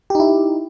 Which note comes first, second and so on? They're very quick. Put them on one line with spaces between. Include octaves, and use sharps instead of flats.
G4 D#4 E4